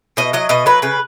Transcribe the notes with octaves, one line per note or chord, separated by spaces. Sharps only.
B2 D#5
F#3 D#5
B2 D#5
F#3 B4
C#3 B4